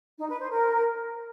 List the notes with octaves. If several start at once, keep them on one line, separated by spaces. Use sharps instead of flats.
D#4
B4
C5
A#4